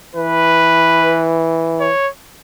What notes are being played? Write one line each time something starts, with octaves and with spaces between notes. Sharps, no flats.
E3 B4
C#5